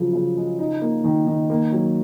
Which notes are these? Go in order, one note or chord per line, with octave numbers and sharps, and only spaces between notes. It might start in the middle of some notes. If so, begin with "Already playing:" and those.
Already playing: C#3 F3 F#3
C#3
G#3
D#4
A#3
D#3
D#3
A#3
F#3